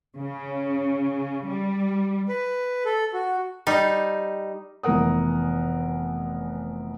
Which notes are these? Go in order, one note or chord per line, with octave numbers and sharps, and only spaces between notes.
C#3
G3
B4
A4
F#4
G3 D#4
F1 E3 B3 A#4 F#5 D#6